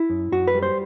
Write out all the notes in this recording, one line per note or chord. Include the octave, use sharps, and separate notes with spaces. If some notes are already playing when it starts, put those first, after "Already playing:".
Already playing: E4
F#2
F#2 F#4
B4
G3
C5